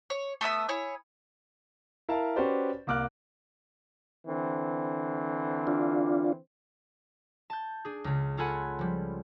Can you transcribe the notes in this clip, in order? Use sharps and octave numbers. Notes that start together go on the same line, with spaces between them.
C#5
A3 B3 E5 D#6
E4 G#4 C#5
E4 A#4 F5 A5
C#4 F#4 G4 B4 C5 D5
C2 A#3 D6 F6 F#6
D3 E3 C4
D4 F4
A5 G6
D4 G#4
C#2 C#3
C#4 F4 A4 F#5 G#5 B5
F3 G3